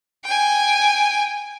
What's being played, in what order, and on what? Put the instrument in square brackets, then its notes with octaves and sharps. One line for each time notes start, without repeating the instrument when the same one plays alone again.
[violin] G5 G#5